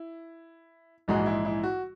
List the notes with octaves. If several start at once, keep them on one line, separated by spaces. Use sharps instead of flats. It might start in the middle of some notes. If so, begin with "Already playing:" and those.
Already playing: E4
A#1 G#2 E3 G#3 F#4
E4
E4
F#4